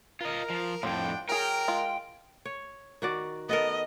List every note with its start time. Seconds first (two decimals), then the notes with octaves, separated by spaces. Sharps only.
0.21 F4 A#4 D#5
0.50 F3
0.83 F2 A2 F3 C4 D4 F#5 G5
1.29 F#3 G#4 A#4 G5
1.68 G#3 F4
2.45 C#5
3.02 D#3 F#4 D5
3.49 B3 A4 A#4 D#5